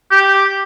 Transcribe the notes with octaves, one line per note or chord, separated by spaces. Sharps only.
G4